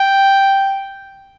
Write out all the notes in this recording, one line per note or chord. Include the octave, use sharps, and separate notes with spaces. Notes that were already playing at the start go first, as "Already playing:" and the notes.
Already playing: G5